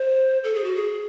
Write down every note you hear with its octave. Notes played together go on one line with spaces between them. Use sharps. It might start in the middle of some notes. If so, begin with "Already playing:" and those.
Already playing: C5
A4
G#4
F#4
G#4